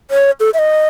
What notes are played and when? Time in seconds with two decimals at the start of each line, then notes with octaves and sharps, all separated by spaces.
0.11 C#5
0.40 A4
0.54 E5
0.59 D#5